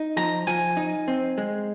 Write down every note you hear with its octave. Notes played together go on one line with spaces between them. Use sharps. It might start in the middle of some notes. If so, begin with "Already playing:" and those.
Already playing: D#4
F3 A#5
F3 G#5
D#4
C4
G#3